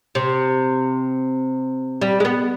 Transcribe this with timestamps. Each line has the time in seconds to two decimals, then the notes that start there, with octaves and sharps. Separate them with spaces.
0.15 C3
2.02 G3
2.20 G#3
2.25 B3